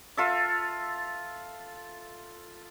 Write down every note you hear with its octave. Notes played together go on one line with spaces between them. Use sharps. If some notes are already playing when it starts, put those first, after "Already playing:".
F4 A4 E5